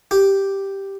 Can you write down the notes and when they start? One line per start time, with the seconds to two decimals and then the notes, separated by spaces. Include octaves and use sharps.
0.11 G4